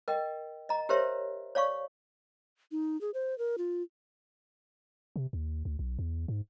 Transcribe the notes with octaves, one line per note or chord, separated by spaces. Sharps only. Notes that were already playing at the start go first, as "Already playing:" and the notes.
A#4 D#5 G5
D#5 A#5
G4 A#4 C5 C#5 E5
C#5 D5 F5 C#6
D#4
G#4
C5
A#4
F4
C3
D#2
D2
B1
E2
G#2